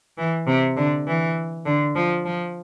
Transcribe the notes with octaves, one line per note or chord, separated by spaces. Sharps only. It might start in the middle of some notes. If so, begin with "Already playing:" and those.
E3
C3
D3
E3
D3
F3
F3